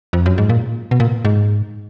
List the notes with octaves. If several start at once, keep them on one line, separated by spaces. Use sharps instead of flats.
F2
F#2
G#2
A#2
B2
A#2
G#2